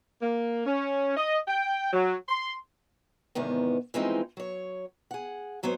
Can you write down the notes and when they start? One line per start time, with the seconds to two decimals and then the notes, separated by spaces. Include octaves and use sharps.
0.22 A#3
0.66 C#4
1.17 D#5
1.48 G5
1.93 F#3
2.29 C6
3.35 E2 G#2 C3 D#3 B3
3.94 E3 F3 G#3 A3 C4 D#4
4.37 F#3 C#5
5.11 G#4 F#5
5.63 G#2 F#3 B3 C5 C#5